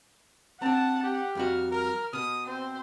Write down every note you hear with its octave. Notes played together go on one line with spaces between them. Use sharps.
C4 D4 F#5 A5
G4
F2 G3 F#4 F6
A#4
B2 D#6
C4 C5